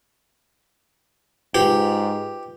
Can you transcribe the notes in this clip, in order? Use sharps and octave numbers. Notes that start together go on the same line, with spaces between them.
G#2 F4 G4 B4